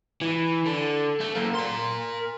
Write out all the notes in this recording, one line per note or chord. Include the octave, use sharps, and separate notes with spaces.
E3
D3
A3
F#2 A#3
A#4 C6